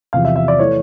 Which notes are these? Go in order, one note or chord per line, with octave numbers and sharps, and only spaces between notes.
E2 C3 F3 F5
E5
E5
D5
E3 A3 C#5